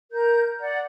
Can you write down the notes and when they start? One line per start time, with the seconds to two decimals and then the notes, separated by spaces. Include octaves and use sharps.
0.12 A#4 G6
0.60 D5 F#5